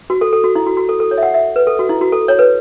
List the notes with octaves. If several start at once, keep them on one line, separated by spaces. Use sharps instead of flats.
F#4
A4
A4
F#4
E4
F#4
F#4
A4
A4
C#5
E5
F#5
E5
B4
A4
F#4
E4
F#4
A4
C#5
B4